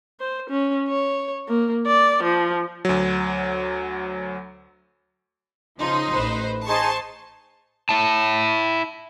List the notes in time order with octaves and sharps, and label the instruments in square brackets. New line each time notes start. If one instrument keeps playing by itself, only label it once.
[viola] C5
C#4
C#5
A#3
D5
F3
[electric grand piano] D2 F#3
[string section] C#3 F3 [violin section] D#4 [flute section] C6
[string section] A1 B4 C5
[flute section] D#4 G#4 [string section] C5 C6 C#6 [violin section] A5
[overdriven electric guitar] E4 A5